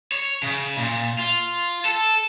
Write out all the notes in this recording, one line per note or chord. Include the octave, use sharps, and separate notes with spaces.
C#5
C#3
A#2
F4
A4